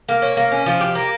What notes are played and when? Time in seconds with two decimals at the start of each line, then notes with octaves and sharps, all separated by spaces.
0.09 A#3
0.22 C#4
0.37 A#3
0.52 C#4
0.66 F3
0.81 G4
0.95 A#3